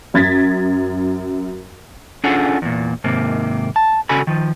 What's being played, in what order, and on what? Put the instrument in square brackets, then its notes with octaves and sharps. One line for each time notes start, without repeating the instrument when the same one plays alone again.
[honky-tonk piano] F#2 G#6 A6 B6
[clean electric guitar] C#4 D4 F4 G#4 A4 F#5
E2 A#2
D#2 G#2 C3 A#3
A5
C#3 C#4 F#4 A4 G#5 B5
D#3 F3